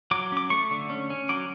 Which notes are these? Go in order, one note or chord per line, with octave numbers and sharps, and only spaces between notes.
F#3 D6
C#4 D6
A3 C#6
D3
C#4
C#4
F#3 D6